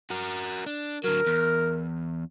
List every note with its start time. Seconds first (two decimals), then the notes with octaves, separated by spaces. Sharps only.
0.10 F#4 A#4
0.66 D4
1.04 D3 F#3 A#4
1.26 E2